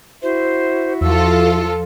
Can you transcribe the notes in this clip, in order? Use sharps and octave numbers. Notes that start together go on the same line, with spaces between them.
E4 F#4 C5 E5
E2 F3 F4 A4 E6